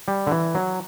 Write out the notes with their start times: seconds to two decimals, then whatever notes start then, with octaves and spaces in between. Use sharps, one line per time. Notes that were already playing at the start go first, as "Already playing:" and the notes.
0.08 G3
0.27 D3
0.31 E3
0.55 F#3